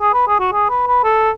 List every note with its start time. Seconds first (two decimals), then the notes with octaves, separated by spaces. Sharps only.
0.01 G#4
0.14 B4
0.28 G#4
0.39 F#4
0.52 G#4
0.69 B4
0.87 B4
1.04 A4